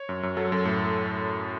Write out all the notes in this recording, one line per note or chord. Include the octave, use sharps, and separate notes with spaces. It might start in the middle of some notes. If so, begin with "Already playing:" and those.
Already playing: C#5
F#2
F#2
F#3 A4
F#2 A4
A2 A4